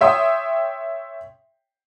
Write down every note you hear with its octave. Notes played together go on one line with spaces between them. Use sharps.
C#5 E5 G5 C6 D#6